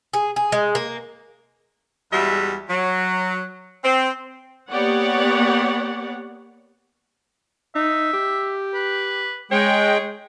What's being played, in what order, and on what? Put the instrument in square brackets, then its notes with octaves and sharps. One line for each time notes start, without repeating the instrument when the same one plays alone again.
[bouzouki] G#4
G#4
G#3
A#3
[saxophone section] E2 G3 G#3 F#4 E5
F#3
C4
[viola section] A#3 B3 G4 C#5 D5 F#5
[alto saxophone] D#4 [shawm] E5
[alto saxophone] G4
[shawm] B4
[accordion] G#3 G5 [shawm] G#4 [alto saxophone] C#5